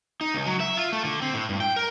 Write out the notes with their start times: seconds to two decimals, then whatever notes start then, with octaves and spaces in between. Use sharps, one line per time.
0.21 D#4
0.34 C#2
0.46 F#3
0.60 E5
0.77 F4
0.92 A3
1.05 D3
1.22 C4
1.34 A2
1.49 G2
1.60 G5
1.76 A#4